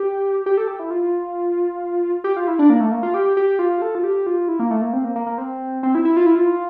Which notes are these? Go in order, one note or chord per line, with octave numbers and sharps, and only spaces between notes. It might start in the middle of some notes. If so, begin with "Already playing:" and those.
Already playing: G4
G4
A4
G4
E4
F4
G4
F4
E4
D4
A#3
A3
A#3
F4
G4
G4
F4
A4
F4
G4
F4
E4
A#3
A3
A#3
C4
A#3
A#3
A#3
C4
C4
E4
E4
F4
E4
F4